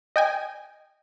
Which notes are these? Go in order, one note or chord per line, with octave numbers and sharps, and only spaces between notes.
D#5 G5 G#5